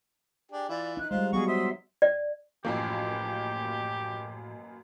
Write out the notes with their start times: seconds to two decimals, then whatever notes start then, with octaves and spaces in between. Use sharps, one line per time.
0.52 D4 G4 G#4
0.69 E3 E4 F4 D5
0.97 D#4 F#6
1.11 G3 G#3 F4 C5 F5 F#6
1.33 F#3 B3 F4 F#4 G#4 C#6
1.47 C5 E5 F#5 C6 D#6
2.02 D5
2.65 A1 F#2 A2 F3 A#3 G4